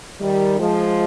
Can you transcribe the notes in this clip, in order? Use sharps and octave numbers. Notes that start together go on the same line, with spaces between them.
D#3 G3
F3 G#3